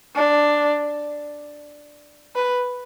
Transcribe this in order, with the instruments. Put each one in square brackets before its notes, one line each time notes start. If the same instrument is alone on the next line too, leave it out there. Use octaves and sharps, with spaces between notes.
[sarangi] D4
B4